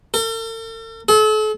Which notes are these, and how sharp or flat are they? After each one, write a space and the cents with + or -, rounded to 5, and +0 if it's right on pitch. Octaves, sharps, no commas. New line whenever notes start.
A4 +45
A4 -40